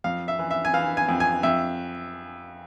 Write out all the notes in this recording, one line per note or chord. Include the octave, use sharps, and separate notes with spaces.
F2 F5
E5
E3
E5
G#5
E3 F5
G#5
F2
G#5
F2 E5